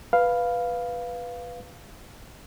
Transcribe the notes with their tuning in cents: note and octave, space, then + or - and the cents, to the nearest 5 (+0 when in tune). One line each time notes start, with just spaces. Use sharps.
B4 +0 F5 +0